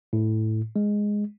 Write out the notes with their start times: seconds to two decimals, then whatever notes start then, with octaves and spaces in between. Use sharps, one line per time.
0.13 A2
0.76 G#3